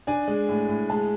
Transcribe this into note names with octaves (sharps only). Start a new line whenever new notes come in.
D4 G#5
G#3
A2
A2
G#3 A5